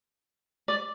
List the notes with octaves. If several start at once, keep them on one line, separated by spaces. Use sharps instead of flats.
D5